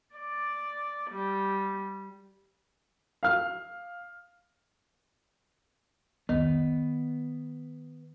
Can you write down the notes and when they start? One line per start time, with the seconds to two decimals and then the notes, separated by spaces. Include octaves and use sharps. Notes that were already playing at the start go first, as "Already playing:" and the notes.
0.15 D5
1.11 G3
3.23 F5 F6
6.29 C2 F2 D#3 B3